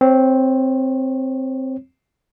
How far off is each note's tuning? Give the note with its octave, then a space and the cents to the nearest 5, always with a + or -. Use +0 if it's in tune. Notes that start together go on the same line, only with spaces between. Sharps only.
C4 +0 C#5 -20